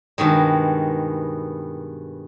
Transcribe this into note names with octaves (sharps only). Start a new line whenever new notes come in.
G2 B2 D#3 G#3